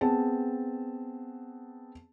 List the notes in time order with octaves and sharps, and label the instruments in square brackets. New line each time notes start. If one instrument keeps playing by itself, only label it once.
[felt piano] B3 C4 G#4 A5